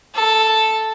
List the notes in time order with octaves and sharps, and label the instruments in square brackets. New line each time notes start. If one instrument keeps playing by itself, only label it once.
[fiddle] A4